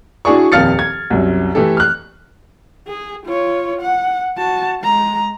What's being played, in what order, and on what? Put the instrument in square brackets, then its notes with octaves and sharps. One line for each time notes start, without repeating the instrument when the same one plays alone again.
[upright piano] D4 E4 F#4 G#4 D5 C#6
D#1 F2 F5 F6 A6 C#7
G#6
C2 F#2
E3 A3 G4 A4
F6 F#6
[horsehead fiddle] G#4
F4 C#5
F#5
F#4 A5
G#3 A#5